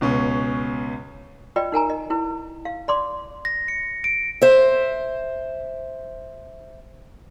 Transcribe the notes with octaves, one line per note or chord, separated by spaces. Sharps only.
C#2 B2 C#4
F4 B4 D5 D#5 G5
D#4 A#4 G#5 A#5
D#5
E4 B4
F5
D5 C6 D6
A#6
C#7
D7
C5 E5